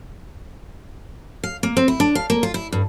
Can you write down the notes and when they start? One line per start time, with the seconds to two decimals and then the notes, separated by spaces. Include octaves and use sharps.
1.43 F5
1.63 A#3
1.77 C4
1.88 E4
2.00 D4
2.15 F5
2.30 A#3
2.43 F4
2.54 E4
2.72 G2